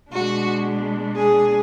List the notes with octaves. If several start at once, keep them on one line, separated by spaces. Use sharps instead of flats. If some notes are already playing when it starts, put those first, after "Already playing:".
B2 G#3 D4 F#4
G#4